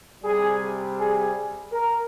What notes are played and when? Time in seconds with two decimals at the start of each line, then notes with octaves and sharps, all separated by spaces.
0.24 C3 G3 G#4
0.98 G#4
1.72 A#4